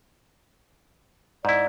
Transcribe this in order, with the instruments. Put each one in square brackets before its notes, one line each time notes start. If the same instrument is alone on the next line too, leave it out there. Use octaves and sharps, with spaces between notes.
[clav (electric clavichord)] G#2 E4 [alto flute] D5